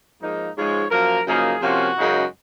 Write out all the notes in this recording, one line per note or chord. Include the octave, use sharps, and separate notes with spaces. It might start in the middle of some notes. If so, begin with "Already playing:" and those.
G#2 F3 A#3 D#4
G#2 F3 G#3 C#5
F#2 F3 A#3 A#4
F#2 C#3 F3 A#3 D#4 G#4
C3 F3 A#3 C#4 F4 F#4
F#2 C#3 G#3 D#4